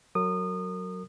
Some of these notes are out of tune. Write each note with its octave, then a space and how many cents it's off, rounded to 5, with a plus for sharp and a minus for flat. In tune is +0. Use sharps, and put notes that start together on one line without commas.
F#3 +0 A#4 -30 D#6 -25